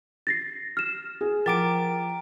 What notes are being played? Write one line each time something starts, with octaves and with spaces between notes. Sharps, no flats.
A6 A#6 C7
F6 E7
G#4
F3 A#4 F#5 G5 A#5 D6 A6 D7